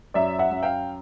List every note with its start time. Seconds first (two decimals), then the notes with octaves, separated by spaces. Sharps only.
0.14 F#2 D5 E5
0.39 E5 F#5
0.51 F#2
0.63 F5 G5